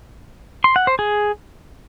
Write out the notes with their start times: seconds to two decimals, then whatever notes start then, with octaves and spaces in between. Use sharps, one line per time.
0.64 C6
0.76 F#5
0.87 C5
0.99 G#4